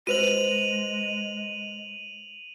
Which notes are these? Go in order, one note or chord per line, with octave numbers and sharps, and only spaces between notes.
G#3 F#4 B4 C5 D#7 F7 F#7